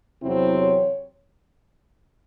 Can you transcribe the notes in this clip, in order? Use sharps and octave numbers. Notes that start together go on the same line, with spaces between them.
E2 C3 F#3 C4 E4
C#5